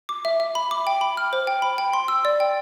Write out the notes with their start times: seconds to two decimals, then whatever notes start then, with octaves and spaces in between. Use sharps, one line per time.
0.09 D6
0.25 E5
0.40 E5
0.55 B5
0.71 D6
0.87 G5
1.01 B5
1.17 F6
1.33 C5
1.47 G5
1.62 B5
1.78 G5
1.93 C6
2.08 E6
2.25 D5
2.40 G5